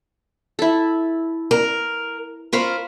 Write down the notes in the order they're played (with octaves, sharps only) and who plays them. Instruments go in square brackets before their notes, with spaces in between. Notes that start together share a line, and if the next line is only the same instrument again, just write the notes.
[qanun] E4 A4
[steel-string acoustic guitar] A#4
[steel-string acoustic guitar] F4 A#4 C5 [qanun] F5 B5 C#6